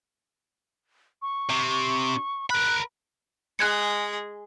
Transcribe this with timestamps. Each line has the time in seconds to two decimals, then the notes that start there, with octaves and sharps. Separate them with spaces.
1.22 C#6
1.50 C3
2.50 A#4 B5 F#6
3.59 G#3 G#4 F#6 G#6 C#7